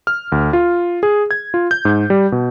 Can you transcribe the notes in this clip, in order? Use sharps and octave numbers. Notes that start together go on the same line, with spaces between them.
F6
D2
F4
G#4
G#6
F4
G6
G#2
G3
B2